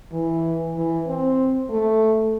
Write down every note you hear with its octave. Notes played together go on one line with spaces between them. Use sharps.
E3
E3
C4
A3